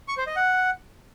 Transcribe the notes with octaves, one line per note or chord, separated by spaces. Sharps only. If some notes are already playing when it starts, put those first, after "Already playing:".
C#6
C5
D#5
F#5